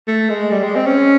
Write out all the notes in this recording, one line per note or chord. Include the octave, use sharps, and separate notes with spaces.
A3
G#3
G3
G#3
C4
C#4